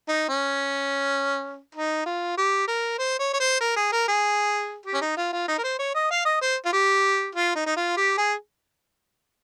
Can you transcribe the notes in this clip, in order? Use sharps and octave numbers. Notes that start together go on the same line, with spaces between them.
D#4
C#4
D#4
F4
G4
A#4
C5
C#5
C#5
C5
A#4
G#4
A#4
G#4
G4
C#4
D#4
F4
F4
D#4
A#4
C5
C#5
D#5
F5
D#5
C5
F4
G4
F4
D#4
D#4
F4
G4
G#4